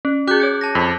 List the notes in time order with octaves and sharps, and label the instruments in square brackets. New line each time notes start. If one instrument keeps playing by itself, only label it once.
[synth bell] C#4
[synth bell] F#4 G#4 [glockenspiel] D6 F#6 G6
[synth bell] C#5 G#6 C#7
[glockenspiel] A5 A#6
[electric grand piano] F2 [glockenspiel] B6